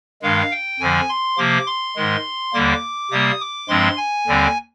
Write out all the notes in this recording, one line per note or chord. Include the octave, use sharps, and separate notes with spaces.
G2 D#3 G#3 F5
G5
F2 D3 F3 G#5
C6
C3 F3 A#3 D6
C6
G#2 D#3 G#3
D#2 D3 G3 A#3 D6
C3 G3 A#3 D#6
D6
G2 F3 G#3 C4 C6
G#5
D#2 D3 G3 C4